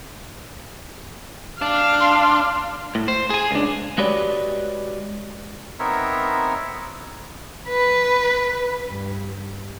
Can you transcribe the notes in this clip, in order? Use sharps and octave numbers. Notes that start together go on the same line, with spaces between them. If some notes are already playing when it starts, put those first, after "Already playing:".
D4 F5
C6
A2
C5
G#4 G#5
C#2 D4
G#3 F#4 G4 B4 C#5 D5
B3 C4 D#4 A#4 C#5 E5
B4
G2